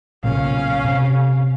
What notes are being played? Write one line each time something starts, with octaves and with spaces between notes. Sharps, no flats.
B1 A#2 C#3 C#4 F5
C3 C4